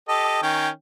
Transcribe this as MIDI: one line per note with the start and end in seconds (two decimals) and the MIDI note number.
0.09 0.41 67
0.09 0.41 69
0.09 0.41 75
0.43 0.69 51
0.43 0.69 61
0.43 0.69 79